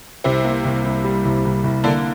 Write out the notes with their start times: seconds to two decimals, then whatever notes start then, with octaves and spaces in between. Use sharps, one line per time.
0.24 C2 C3 C4
0.45 A#3
0.65 C2
0.85 C2
1.04 G3
1.25 C2
1.45 C2
1.64 C2
1.84 D3 A#3 D4